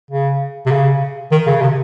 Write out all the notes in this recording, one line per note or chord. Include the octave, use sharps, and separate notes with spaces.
C#3
C3
C#3
D#3
C#3
C#3
C3